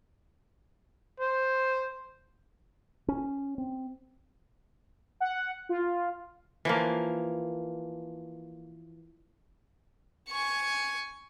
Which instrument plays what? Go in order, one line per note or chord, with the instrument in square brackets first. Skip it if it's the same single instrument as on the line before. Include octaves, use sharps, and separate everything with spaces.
[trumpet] C5
[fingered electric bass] C#4
C4
[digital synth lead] F#5
F4
[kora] E3 F3 A#3
[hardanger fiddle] G#5 C#6